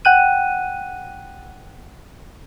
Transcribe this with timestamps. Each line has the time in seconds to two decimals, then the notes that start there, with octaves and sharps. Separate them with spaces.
0.05 F#5 G5 F#6 D#7